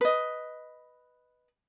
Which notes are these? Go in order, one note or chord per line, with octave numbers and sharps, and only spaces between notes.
B4 D#5